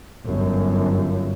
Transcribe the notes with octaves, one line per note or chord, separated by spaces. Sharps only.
G1 F#2